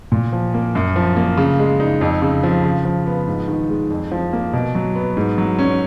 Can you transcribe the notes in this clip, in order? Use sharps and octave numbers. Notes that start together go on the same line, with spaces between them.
A#2
F3
A#3
F#2
F3
A#3
C#3
G#3
D#4
F2
C#3
F3
C#3
F3
B3
G#2
D#3
G#3
F2
F3
A#3
B2
F#3
B3
G#2
F#3
C#4